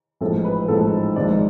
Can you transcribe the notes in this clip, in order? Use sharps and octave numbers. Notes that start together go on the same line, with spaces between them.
A1 G#2 F3 A4
B4
A1 G#2 F3 A4
G#1 G#2 F3 D5